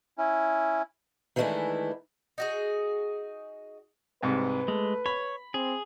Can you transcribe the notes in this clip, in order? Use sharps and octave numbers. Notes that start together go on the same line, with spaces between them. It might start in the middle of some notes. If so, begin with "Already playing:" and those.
C#4 E4
D#3 E3 G#3 A3 D4 E4
D#4 F#4 G#4
C2 G#2 C3 B4
G#3 A3
C#5 B5
C4 G#4